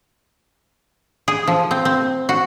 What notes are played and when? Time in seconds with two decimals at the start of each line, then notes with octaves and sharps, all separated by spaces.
1.28 G#4
1.47 F3
1.71 C4
1.85 C4
2.29 F#4